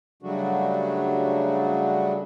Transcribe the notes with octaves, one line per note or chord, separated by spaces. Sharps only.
C#3 F#3 G3 A3 D4 F#4